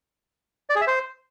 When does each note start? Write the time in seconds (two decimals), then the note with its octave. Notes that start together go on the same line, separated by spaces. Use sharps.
0.70 D5
0.75 G#4
0.81 E5
0.87 C5